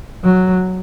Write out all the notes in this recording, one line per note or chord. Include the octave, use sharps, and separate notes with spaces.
F#3